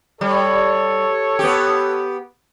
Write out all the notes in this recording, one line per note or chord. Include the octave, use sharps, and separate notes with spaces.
G3 A4 C#5
B3 G4